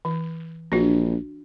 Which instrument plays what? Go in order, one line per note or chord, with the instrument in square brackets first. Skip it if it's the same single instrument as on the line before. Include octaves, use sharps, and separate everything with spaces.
[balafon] E3
[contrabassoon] A#1 [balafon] D4 F#4